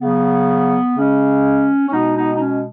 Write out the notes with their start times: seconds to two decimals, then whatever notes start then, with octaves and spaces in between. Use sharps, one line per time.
0.01 C#3 F#3 B3
0.96 C#3 G#3 C#4
1.87 C#4
1.91 B2 G#3 B3 D#4
2.15 B3 D#4
2.35 D#4
2.39 C#4